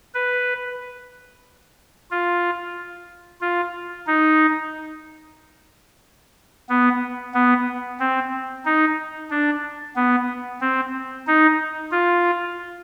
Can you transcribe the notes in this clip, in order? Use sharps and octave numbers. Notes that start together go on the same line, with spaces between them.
B4
F4
F4
D#4
B3
B3
C4
D#4
D4
B3
C4
D#4
F4